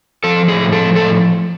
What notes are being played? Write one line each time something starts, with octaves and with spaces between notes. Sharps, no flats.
F3 A4
A2 G#4
F3 A4
A2 A4